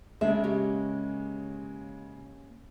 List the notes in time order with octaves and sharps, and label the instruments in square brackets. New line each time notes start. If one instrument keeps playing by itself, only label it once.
[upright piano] C#3 G#3 [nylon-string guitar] D4 E5
[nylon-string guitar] A#3 C#4 G4